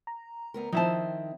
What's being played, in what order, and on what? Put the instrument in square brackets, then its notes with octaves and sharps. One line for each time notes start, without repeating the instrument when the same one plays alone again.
[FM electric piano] A#5
[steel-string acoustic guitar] D2 B3 A#4
[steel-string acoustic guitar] D#3 C4 [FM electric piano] F3 [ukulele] D#4 E4 A5